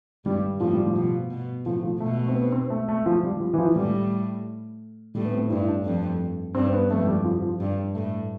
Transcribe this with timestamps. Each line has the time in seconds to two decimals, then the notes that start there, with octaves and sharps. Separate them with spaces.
0.25 G2 G3
0.60 A2 F3
0.73 G3
0.86 F3
0.96 B2
1.31 B2
1.65 A2 F3
1.83 F3
2.00 B2 A3
2.18 A3
2.28 C4
2.35 B3
2.52 C4
2.70 A3
2.88 A3
3.06 F3
3.23 G3
3.40 F3
3.53 E3
3.58 F3
3.76 A2 G3
5.15 A2 G3
5.25 B3
5.33 C4
5.50 G2 E4
5.68 D4
5.85 F2
6.55 G2 C4
6.73 B3
6.90 F2 A3
7.07 G3
7.25 F3
7.42 F3
7.60 G2
7.94 A2 A3